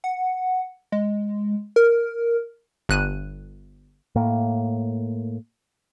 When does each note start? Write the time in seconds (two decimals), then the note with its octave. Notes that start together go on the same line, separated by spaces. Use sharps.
0.04 F#5
0.92 G#3
1.76 A#4
2.89 G1 F#6 D#7
4.15 A2 A#3